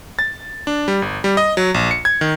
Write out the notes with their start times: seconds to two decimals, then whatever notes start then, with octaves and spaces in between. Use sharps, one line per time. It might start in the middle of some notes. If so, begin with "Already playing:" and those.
0.19 A6
0.67 D4
0.88 G3
1.02 G1
1.24 G3
1.37 D#5
1.57 F#3
1.74 A#1
1.91 C#7
2.05 G#6
2.21 D#3